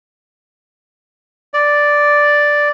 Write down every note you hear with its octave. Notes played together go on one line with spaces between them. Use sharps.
D5